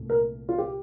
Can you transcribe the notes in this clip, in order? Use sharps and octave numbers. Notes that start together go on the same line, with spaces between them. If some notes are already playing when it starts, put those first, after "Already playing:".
Already playing: C2 A#2 A3
A#4
F4
G4